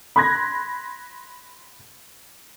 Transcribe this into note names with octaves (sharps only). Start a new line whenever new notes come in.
B5 C6 F#6 G#6 A#6